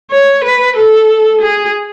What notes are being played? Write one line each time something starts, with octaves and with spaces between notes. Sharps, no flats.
C#5
B4
A4
G#4